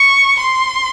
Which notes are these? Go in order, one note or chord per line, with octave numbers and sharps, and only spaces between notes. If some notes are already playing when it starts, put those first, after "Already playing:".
Already playing: C#6
C6